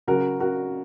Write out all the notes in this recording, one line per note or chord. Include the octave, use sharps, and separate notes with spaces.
C#3 F#3 F#4 A#4
F#4 A#4